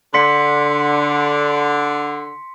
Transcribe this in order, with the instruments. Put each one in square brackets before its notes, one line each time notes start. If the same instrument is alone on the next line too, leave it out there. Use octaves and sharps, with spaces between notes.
[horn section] D3 [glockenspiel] C6 B6 C#7